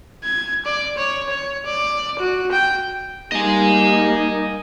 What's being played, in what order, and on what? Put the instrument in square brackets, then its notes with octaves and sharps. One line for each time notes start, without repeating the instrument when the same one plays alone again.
[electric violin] G#6
D5
C#5
C#5
D5
F#4
G5
[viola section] G3 A#3 D#4 [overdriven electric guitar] D#5 G#5